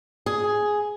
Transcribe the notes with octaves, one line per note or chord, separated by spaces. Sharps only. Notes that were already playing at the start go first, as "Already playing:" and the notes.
G#4